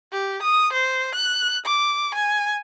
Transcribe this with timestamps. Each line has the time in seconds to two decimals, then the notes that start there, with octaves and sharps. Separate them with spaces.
0.12 G4
0.43 D#6
0.73 C5
1.15 F#6
1.66 D6
2.14 G#5